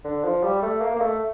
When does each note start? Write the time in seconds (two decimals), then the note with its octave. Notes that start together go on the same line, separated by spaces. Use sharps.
0.04 D3
0.24 F3
0.43 G3
0.62 A3
0.81 A#3
0.96 A#3
1.01 A3